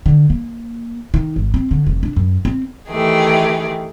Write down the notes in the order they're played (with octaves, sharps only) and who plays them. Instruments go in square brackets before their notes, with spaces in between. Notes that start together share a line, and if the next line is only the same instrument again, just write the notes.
[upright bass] D3
A#3
D#3
G#1
C4
D3
F1
D4
F#2
C4
[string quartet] D#3 E3 A3 G4 G#4